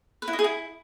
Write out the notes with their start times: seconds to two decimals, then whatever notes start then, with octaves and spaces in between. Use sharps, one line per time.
0.22 B4
0.28 E4
0.33 D#5
0.39 G#4
0.44 E4